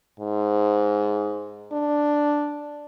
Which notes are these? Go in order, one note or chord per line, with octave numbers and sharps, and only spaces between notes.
G#2
D4